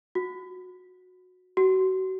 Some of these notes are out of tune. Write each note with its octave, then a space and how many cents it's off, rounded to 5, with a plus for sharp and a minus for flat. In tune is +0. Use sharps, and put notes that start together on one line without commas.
F#4 -20
F#4 +30